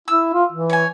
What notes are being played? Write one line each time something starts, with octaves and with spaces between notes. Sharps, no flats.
E4 E6
F4
E3
C#5 G#5